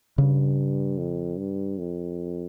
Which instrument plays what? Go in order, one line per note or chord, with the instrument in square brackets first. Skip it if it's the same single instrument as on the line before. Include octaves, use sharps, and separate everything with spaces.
[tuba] G2 [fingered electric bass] C#3
[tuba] F2
G2
F2